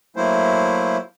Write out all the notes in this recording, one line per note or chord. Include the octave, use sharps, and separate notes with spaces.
F#3 A3 A#3 E4 C5